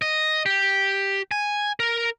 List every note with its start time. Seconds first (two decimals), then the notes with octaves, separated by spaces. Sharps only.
0.02 D#5
0.46 G4
1.31 G#5
1.80 A#4